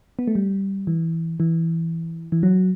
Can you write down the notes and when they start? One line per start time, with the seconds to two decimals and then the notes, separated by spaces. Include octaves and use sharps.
0.19 B3
0.27 A3
0.35 G3
0.87 E3
1.40 E3
2.32 E3
2.43 F#3